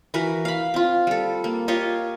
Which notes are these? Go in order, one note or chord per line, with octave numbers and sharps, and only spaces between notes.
E3 F#4 A#4 B4
F5 B5
C4 F4
G3 A4
A#3
F4 G4 C#5 D#5